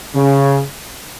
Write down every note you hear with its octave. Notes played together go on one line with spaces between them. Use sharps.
C#3